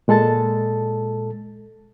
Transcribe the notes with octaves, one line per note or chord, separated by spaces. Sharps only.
A#2 G#3 A4 A5 A6